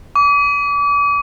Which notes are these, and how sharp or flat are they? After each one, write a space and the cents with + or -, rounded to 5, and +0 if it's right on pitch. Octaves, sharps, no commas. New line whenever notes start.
D6 -35